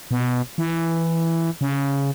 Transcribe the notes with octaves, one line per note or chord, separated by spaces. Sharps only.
B2
E3
C#3